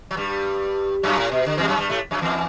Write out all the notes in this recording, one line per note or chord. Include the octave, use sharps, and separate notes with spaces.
F#3
G2 G3
F#2 F#3
A2
B2
D3
E2 E3
G3
F#2 F#3
G2 G3
A2 A3
F#2 F#3
E2 E3